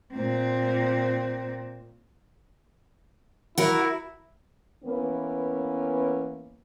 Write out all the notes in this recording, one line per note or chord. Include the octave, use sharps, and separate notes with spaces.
A#2 C4
E4 F#4 A#4
E3 A#3 B3 C#4